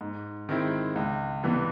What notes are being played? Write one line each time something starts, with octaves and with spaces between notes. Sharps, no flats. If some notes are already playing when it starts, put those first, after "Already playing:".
G#2
D#3 G#3 C4 E4
C#2
C3 E3 G3 B3